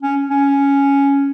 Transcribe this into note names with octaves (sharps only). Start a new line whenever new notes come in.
C#4
C#4